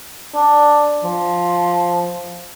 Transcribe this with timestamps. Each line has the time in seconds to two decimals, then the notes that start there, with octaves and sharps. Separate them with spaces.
0.35 D4
1.04 F3